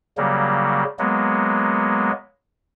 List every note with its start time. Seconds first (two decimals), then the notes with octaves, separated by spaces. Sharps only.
0.18 C#3 F#3 G3 A#3
0.99 F#3 G#3 A#3 B3